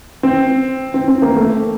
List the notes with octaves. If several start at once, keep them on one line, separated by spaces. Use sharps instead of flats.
C4
C4
C4
A#3
A3